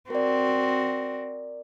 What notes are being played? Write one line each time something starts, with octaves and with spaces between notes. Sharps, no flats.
C4 F#4 A#4 D5